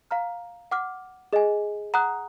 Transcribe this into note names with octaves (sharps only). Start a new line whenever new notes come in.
F5 A#5 F6
F#5 D6 F6
G#4 D#5 G#5
F#5 A#5 D#6 F#6